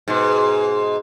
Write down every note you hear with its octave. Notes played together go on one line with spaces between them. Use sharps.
G#2 B2